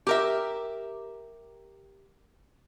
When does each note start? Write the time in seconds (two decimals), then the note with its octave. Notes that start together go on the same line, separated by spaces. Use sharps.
0.07 G4 A#4 E5